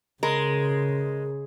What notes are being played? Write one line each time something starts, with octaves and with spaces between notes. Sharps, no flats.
C#3 G#3 A#4